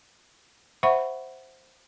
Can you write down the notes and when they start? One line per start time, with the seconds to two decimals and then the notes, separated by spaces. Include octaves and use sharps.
0.83 C5 E5 F#5 B5 C#6